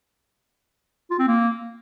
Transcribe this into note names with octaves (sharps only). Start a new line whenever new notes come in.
F4
C4
A#3